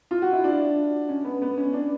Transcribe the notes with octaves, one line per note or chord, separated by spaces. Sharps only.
F4
F#4
E4
D4
C#4
B3
B3
C#4
D4